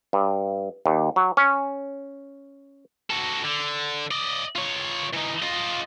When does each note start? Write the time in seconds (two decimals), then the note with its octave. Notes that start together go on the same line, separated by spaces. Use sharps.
0.13 G2
0.86 D#2
1.16 F#3
1.37 C#4
3.10 F#4 A4
3.44 D3
4.11 D5 D#5
4.56 F4 C#5
5.13 E3 D#4
5.42 F4 D#5